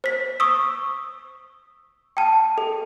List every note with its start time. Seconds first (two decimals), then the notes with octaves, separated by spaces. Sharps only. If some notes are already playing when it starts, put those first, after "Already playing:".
0.04 C5 B6
0.40 C#6 D#6 E6
2.17 G5 A5
2.58 A4